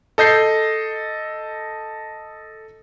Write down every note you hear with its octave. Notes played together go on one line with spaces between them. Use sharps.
A4 D#5 G6 C7